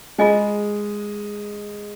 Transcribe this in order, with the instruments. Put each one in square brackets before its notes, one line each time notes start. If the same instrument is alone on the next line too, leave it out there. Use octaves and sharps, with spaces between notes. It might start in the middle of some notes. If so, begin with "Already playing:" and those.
[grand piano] G#3 [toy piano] F4 G#4 D#5 G#5